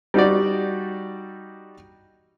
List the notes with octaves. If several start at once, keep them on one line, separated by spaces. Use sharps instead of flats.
G3 D#4 F#4 D5